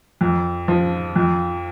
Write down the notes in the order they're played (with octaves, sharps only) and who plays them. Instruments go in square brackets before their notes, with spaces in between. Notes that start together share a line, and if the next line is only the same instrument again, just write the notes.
[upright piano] F2
F3
F2